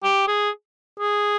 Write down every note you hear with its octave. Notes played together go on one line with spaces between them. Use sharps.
G4
G#4
G#4